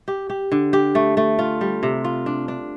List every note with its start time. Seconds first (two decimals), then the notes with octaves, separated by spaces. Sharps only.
0.08 G4
0.30 G4
0.52 D3
0.73 G4
0.95 A3
1.17 A3
1.39 F4
1.61 G3
1.83 C3
2.04 F4
2.26 D4
2.48 D4